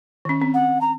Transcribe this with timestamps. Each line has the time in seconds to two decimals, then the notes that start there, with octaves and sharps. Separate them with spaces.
0.25 D#3 C#4
0.42 C4
0.54 F#5
0.81 A#5